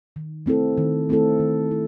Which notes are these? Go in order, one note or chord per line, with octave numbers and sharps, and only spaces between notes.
D#3
A3 C4 E4 A4
D#3
A3 C4 E4 A4
D#3
A3 C4 E4